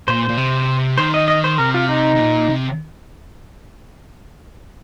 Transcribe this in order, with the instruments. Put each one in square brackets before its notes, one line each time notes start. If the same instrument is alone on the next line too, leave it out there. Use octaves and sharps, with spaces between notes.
[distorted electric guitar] A#2 [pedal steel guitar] C5
[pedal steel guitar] C5
[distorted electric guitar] A#2
C3
[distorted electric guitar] D#3 [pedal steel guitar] C5
[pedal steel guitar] D#5
D#5
C5
[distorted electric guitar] C3 [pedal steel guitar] A#4
[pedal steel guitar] F4
D#4
[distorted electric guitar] C3
A#2
C3